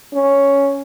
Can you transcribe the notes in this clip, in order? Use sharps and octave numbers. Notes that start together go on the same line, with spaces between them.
C#4